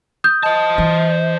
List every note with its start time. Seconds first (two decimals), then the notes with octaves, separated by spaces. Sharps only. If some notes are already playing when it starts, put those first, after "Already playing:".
0.24 D#6 G6
0.43 C5 D#5 A5
0.78 E3